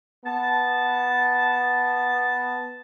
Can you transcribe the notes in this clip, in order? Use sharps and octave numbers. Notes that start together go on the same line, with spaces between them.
B3 A5